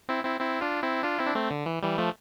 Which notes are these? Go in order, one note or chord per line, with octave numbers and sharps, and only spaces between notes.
C4 E4
C4 E4
C4 E4
D4 F4
C4 E4
D4 F4
C4 E4
D4
A3 C4
D3
E3
E3 G3
F3 A3